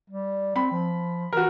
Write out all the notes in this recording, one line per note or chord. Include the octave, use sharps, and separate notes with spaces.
G3
C4 B5
F3
E3 F#4 A#4